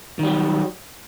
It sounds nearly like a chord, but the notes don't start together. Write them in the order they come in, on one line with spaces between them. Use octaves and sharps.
D#3 G3 F#3